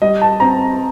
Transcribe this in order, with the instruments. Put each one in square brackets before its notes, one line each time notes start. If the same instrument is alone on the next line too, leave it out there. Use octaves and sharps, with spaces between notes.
[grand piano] G3 [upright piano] D#5
[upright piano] A5
[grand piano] C4 [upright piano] A#5